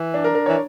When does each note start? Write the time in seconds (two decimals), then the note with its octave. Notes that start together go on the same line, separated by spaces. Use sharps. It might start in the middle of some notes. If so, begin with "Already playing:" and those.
Already playing: E3
0.14 D4
0.24 A#4
0.35 A#4
0.46 E3 C#5